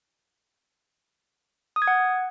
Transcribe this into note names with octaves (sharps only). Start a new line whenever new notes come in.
D#6
G#6
F#5